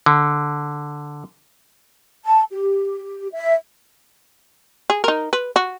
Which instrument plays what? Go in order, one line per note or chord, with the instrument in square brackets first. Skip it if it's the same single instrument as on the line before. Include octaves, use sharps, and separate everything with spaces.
[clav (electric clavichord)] D3
[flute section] A5
G4
E5
[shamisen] G#4
D#4 A#4
B4
F#4